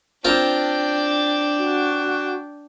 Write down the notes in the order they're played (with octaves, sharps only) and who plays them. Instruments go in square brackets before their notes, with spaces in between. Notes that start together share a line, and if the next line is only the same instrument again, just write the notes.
[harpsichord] C4 F4 A#4 [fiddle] D4 G5
[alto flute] F#4